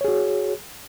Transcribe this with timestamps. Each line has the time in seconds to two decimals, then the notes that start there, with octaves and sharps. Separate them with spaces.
0.01 C#5
0.04 G#4
0.08 F#4